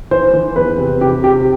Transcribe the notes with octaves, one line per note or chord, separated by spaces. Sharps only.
E3 C5
E3
E2 B4
C3
C3 G4
C3 G4